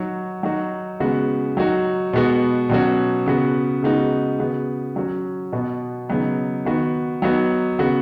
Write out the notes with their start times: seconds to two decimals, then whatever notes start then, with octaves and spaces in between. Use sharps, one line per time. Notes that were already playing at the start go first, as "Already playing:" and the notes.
Already playing: F#3 D#4 F#4
0.43 F#3 D#4 F#4
1.00 C#3 G#3 B3 F#4
1.57 F#3 D#4 F#4
2.13 B2 G#3 B3 F#4
2.70 B2 F#3 C#4 F#4
3.26 C#3 B3 F#4
3.83 C#3 G#3 B3 D#4 F#4
4.39 C#3 B3 F#4
4.96 F#3 C#4 F#4
5.52 B2 B3 F#4
6.09 C#3 F#3 B3 D#4
6.65 D#3 B3 F#4
7.22 F#3 B3 D#4 F#4
7.79 C#3 B3 F#4